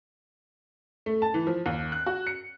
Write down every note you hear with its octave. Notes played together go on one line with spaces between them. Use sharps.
A3
A5
E3
F3
D#2
F#6
F#4
C#7